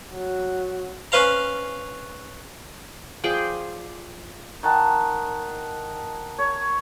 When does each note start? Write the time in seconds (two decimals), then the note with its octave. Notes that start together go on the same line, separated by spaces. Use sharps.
0.12 F#3
1.12 C#4 B4 C5 F5 A#5
3.24 F3 G#4 D5 G5
4.63 D#3 F#5 A5
6.39 C#5